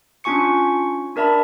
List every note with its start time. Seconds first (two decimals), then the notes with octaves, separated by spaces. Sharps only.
0.24 C#4 D4 F4 G#5 C#6 C#7
1.16 D4 A#4 D5 E5 A5 B5